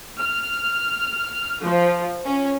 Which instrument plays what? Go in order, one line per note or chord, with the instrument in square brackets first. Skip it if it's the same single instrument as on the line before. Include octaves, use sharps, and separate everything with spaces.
[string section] F6
F3
C#4